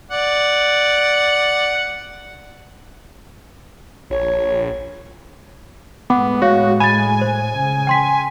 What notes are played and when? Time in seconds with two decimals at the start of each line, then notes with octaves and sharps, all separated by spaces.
0.11 D5 F#5
4.10 A#1 C#5
6.10 A2 G#3 B3 F#5 D6
6.42 F#4 C#5 F5
6.80 G#5 B5 A6
7.21 C5
7.57 C#3
7.87 G5 C6 B6